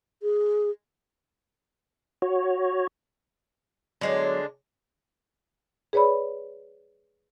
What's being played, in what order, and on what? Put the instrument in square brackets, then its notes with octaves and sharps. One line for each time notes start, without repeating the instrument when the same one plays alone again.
[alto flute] G#4
[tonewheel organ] F#4 C#5
[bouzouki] D3 G#3 D4 [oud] F#3 B3
[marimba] G#4 B4 C#5 D5 B5